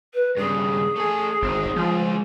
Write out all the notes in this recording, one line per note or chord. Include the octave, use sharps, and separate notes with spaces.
B4
G2 C#3 G#4
A3 G#5
G#1 C4 D#4
F3 G#3 F4